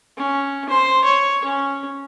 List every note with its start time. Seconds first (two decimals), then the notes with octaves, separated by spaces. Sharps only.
0.17 C#4
0.69 C5
1.04 C#5
1.44 C#4